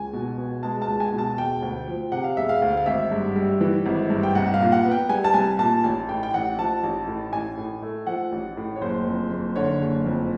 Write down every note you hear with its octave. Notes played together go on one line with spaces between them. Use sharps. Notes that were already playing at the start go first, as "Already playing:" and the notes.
Already playing: C#2 G#5
B2
B3
G#3 A5
A5
C#2
G#5
B2
A5
E1 G5
D2
F3
C3 F#5
F5
E1 E5
F5
D2
F5
G#1 E5
G2
G3
E3
G#1
G2
G5
C2 F#5
F5
A#2
F#5
B3
G5
G3 G#5
A5
C2 G#5
A#2 A5
A1 G#5
A2 G5
G5
A1 F#5
F3 A5
A1
A2
A1 G#5
A2
A3
F3 F#5
A1
A2
C#5
F#1 C5
F2
F#1
D3 C#5
F#1
F2